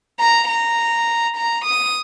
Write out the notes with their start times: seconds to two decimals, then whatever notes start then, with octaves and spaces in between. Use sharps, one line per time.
0.20 A#5
0.48 A#5
1.36 A#5
1.64 D#6